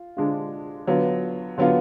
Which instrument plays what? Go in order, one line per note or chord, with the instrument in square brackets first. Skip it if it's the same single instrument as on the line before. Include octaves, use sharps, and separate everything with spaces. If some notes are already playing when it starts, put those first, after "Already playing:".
Already playing: [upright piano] F4
D3 G#3 D4 F4
D3 F#3 B3 F4
D3 F#3 B3 F4